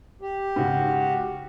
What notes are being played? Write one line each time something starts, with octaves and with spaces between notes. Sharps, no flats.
G4
G#2 C#3 F#4